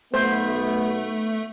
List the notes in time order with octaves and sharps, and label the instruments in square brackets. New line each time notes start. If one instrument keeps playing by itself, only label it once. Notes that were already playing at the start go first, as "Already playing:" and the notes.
[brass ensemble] B1 B3 [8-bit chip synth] A3 [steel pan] C5